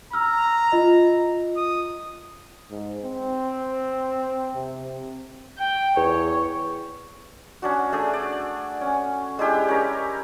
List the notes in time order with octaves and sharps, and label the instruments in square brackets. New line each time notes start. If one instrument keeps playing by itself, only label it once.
[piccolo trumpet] A#5 [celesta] E6 F6
[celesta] F4 D#5
[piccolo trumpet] D#6
[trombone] G#2
C4
C3
[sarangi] G5
[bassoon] E2 [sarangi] C#5
[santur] C#4 D4 F#4
A3 D4 G#4
D5
C#4
G#3 D4 E4 G4
C#4 A#4